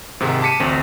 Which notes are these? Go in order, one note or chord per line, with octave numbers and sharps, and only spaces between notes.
G#2 C3 D#3 G#3
A5 D6 B6 C#7 D#7
A1 D2 C4